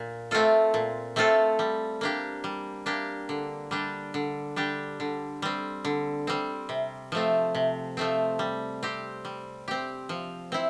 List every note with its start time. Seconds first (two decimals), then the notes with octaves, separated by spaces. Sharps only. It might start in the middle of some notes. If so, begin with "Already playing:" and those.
Already playing: A#2
0.31 A3 C4 F4 A4
0.74 A#2
1.16 A3 C4 F4 A4
1.59 G3
2.01 A#3 D4 G4
2.44 G3
2.86 A#3 D4 G4
3.29 D3
3.71 G3 D4 G4
4.14 D3
4.56 G3 D4 G4
5.00 D3
5.42 G3 C4
5.85 D3
6.27 G3 C4
6.69 C3
7.12 F3 A3 C4
7.55 C3
7.97 F3 A3 C4
8.39 G3
8.83 C4 G4
9.25 G3
9.68 C4 G4
10.09 F3
10.52 C4 E4